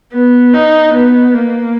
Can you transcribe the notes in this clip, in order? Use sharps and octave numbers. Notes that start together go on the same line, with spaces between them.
B3
D#4
B3
A#3